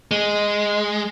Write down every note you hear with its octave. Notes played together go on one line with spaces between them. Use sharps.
G#3